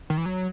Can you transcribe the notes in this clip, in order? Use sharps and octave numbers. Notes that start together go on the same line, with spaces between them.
D#3
E3
F#3